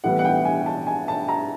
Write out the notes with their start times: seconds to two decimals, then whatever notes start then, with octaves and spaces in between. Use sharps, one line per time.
0.04 A2 E3 G3 B3 F#5
0.19 F#5
0.25 G5
0.45 G#5
0.66 A5
0.87 G#5
1.08 A5
1.29 A#5